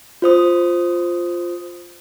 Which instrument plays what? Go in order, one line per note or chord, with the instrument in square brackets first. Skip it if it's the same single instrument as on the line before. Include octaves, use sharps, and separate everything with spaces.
[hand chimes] F4 C5 D#6